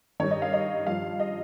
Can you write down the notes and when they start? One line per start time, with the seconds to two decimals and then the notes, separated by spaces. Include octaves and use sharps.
0.20 G2 D#3 C#5
0.31 D#5
0.42 F5
0.53 D#5
0.87 G2 F3 F5
1.20 D#5